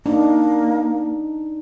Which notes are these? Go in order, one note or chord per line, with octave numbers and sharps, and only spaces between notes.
A#3 D4 D#4